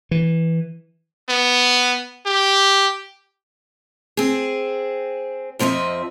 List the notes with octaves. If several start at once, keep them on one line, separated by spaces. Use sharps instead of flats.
E3
B3
G4
C4 G#4
F2 F3 C4 D#5 E5